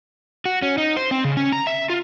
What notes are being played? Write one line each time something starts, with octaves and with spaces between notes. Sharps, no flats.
F#4
C#4
D#4
C5
C4
C#3
C#4
A#5
E5
F4